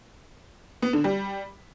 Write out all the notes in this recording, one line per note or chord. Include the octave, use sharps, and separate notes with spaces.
B3
D3
G3